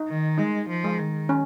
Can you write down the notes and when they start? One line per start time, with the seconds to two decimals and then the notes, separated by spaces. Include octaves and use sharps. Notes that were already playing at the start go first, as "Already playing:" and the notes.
Already playing: D#4
0.08 D#3
0.38 G#3 D#4
0.69 F3
0.84 G#3
0.99 D#3
1.29 C#4